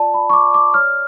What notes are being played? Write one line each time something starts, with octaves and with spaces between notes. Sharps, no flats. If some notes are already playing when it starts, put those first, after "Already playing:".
Already playing: F4 D5 A5
B5
D5
C#6
D6
D5
D6
C#5 F6